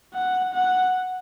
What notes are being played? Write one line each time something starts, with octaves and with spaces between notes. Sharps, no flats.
F#5
F#5